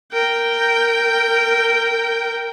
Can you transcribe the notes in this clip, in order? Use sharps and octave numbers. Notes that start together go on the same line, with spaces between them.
A#4 G5